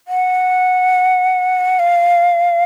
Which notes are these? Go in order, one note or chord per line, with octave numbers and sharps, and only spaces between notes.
F#5
F5